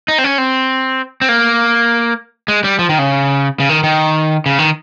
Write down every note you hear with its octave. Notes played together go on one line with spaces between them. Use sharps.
D#4
C4
C#4
C4
C4
A#3
G#3
G3
F3
D#3
C#3
C#3
D#3
D#3
C#3
D#3